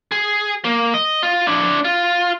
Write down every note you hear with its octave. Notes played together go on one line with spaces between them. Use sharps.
G#4
A#3
D#5
F4
D4 E4
F4